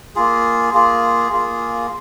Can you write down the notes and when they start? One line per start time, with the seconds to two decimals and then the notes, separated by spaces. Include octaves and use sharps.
0.15 A#3 F4 G#4
0.73 A#3 F4 G#4
1.31 A#3 F4 G#4